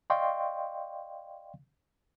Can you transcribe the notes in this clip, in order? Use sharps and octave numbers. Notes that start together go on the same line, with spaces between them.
D5 D#5 F5 G5 C6 C#6